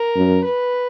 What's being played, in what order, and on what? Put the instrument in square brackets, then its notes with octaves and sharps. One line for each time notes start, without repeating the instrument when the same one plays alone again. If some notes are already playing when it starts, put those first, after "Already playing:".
Already playing: [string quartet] A#4
[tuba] F#2
[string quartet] B4